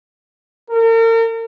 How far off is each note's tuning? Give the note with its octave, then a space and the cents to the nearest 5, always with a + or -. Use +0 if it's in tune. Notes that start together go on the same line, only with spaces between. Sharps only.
A#4 -40